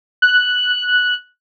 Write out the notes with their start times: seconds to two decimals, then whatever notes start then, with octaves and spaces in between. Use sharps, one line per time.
0.22 F#6